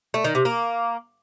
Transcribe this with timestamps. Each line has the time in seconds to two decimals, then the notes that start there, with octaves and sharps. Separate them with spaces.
0.14 A3
0.24 D#3
0.35 C3
0.45 A#3